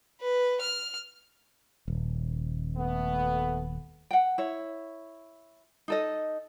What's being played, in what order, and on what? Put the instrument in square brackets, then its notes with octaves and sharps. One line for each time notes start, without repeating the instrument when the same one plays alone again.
[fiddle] B4
F6
[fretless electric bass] D#1
[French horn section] A3 B3
[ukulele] F#5 G5
E4 C#5
D#4 A4 D#5